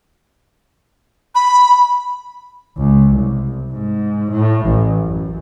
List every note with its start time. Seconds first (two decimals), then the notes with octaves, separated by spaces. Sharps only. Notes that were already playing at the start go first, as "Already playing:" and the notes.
1.35 B5
2.78 C#2
3.15 C2
3.72 G#2
4.32 A2
4.66 A1
5.04 F#2